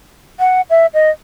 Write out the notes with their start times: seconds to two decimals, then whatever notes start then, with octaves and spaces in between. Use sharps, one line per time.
0.40 F#5
0.70 E5
0.94 D#5